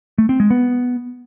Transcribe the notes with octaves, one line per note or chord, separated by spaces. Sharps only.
A3
C4
G#3
B3